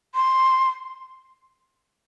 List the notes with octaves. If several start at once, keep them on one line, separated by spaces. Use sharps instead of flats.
C6